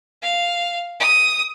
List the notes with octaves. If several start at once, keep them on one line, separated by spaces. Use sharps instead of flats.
F5
D#6